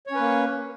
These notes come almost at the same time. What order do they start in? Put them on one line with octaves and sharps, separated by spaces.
C#5 C#4 B4 A#3